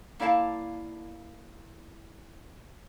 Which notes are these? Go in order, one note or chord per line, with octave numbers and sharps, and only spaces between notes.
A#3 E4 D5 F5 A5